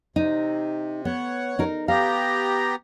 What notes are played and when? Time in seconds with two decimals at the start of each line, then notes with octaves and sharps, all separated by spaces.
0.16 C3 D#4
1.05 B3 C#5 F#5
1.59 D#4 A#4
1.88 B3 G4 F5 A#5